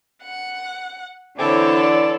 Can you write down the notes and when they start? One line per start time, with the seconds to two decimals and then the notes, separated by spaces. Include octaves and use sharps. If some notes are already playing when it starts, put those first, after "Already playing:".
0.22 F#5
1.39 D3 E3 C4 E4 A4 C#5 D6
1.79 D5